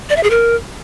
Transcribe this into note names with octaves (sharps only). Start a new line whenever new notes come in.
D5
E5
G#4
A#4